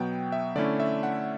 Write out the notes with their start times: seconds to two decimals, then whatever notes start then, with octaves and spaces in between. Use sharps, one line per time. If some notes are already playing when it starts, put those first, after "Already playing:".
Already playing: B2 F#3 B3 G5
0.32 E5
0.55 D3 A3 C#4 E4 D5
0.80 E5
1.03 F#5